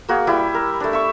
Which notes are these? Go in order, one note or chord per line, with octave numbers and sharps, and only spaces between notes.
A#3 F#4 G#4
G3 E4 G4 B5
A#4
A3 D4
E5 C#6